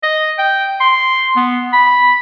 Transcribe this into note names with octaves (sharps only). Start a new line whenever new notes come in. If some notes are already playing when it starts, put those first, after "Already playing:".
D#5
G5
C6
B3
B5